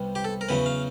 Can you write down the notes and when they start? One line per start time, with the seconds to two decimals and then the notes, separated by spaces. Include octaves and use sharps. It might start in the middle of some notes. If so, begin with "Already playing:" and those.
Already playing: C2 C3 G3 B3
0.15 G4
0.24 A4
0.41 A#4
0.49 E2 C#3 F#3 B4
0.66 F5